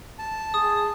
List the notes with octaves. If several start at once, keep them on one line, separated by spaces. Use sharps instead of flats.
A5
G#4 D#6